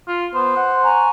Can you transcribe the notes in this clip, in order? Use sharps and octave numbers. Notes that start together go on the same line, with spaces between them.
F4
B3 C5
F#5
G#5 A#5 C#6